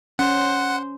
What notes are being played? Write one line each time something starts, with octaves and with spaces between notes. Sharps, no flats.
C#4 C5 F#5